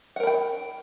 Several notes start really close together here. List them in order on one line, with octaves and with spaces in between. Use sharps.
F#5 A#4 B5 G5